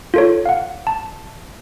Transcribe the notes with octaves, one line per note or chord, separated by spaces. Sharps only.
F4 A4 C#5
F5 F#5
A5